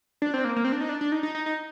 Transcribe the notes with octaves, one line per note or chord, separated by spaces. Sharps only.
D4
C4
A#3
A#3
C4
D4
D#4
D4
D4
D#4
D#4
D#4
D#4